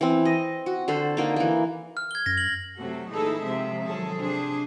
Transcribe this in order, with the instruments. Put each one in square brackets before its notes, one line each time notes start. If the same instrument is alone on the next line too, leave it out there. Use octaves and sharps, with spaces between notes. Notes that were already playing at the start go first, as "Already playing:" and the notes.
[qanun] E3 C4
D#5
F#4
D3 A4 C5
D3 A#3 D#4
E3 A#3
[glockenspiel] F6
G#6 G7
[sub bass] F#2 [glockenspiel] A#6
[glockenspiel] F#7
[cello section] C3 F#3 A3 F#4 A4
A#2 E3 D#4 E4 G#4 A4
C3 F3 G#3 C4 E5
D#3 F3 F#3 G#4 A4
C3 D4 G#4 C5